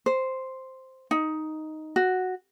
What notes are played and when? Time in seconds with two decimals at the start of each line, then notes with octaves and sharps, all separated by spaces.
0.06 C5
1.11 D#4
1.96 F#4